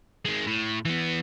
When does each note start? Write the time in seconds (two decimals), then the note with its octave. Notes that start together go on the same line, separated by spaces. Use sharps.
0.25 D#3 G#3
0.47 A2
0.85 E3 B3